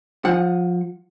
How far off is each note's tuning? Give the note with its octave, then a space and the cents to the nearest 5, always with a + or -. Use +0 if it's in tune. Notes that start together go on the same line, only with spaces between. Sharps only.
F3 +20 F#5 +0